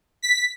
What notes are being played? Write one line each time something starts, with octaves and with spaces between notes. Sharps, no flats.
B6